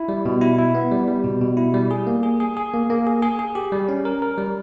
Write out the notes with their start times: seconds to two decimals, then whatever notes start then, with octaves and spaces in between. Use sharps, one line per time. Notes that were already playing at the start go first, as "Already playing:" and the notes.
Already playing: E4
0.08 G3
0.26 B2
0.41 E4
0.58 E4
0.75 B3
0.91 G3
1.08 G3
1.24 B2
1.41 B2
1.57 E4
1.74 G3
1.91 G#4
2.07 A#3
2.23 G#4
2.40 G#4
2.57 G#4
2.74 A#3
2.90 A#3
3.07 G#4
3.22 G#4
3.39 G#4
3.55 G4
3.72 G3
3.89 C#4
4.05 A#4
4.22 A#4
4.38 G3